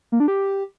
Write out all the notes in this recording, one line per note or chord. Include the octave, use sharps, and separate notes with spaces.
A#3
D4
G4